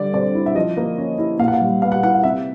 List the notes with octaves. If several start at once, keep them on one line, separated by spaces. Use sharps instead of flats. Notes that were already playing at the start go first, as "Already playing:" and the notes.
Already playing: D3 G3 D5
C4 D5
E4
E5
F3 D#5
A#3
C#4
E4
A#2 F5
F#5
F5
G3
B3 F5
F#5
E4 F#5
F5
C3 E5